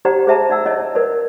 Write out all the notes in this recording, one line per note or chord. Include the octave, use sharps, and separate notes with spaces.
D#4 G4 C5 D5 F#5 A#5
G#4 C5 E5 A5 A#5
D#4 D5 F#5 E6
E4 C#5 D#5 G#5
A#4 B4 D5 G#5